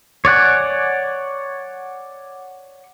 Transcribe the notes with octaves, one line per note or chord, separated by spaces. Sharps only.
C#5 D5 F#5 G#5